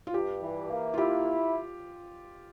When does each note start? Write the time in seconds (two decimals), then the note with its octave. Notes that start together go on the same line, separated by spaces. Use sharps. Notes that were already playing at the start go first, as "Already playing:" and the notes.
0.07 F4
0.14 G2 G4
0.42 E3
0.71 A#3
0.94 F4
0.98 E4 G4